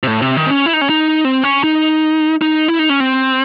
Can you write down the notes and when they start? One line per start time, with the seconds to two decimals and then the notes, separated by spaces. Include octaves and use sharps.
0.03 C3
0.07 A2
0.22 C3
0.37 D#3
0.47 C4
0.51 C#4
0.66 E4
0.73 D#4
0.81 C#4
0.89 D#4
1.25 C4
1.44 C#4
1.64 D#4
2.42 D#4
2.68 E4
2.79 D#4
2.89 C#4
3.00 C4